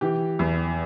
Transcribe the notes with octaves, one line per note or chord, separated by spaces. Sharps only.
E3 G4
E2